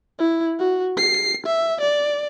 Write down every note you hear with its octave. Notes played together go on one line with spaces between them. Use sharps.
E4
F#4
C7
E5
D5